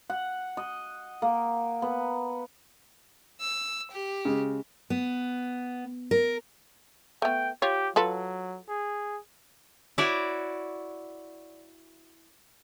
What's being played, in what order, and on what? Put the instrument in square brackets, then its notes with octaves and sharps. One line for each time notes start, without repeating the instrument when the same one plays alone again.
[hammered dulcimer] F#5
D#5
A#3
B3
[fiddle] E6
G4
[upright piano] C#3 G#3
[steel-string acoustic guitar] B3
A#4
[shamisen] A3 B3 [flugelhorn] G5
[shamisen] F4 C#5 [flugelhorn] G4
[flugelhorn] F#3 [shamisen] F4 A4 B4
[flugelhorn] G#4
[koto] E4 F#4 C#5 D5